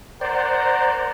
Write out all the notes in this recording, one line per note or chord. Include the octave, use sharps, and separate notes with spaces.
A#4 C5 D5 F#5 A#5